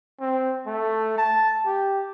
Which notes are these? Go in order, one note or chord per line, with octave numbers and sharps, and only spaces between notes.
C4
A3
A5
G4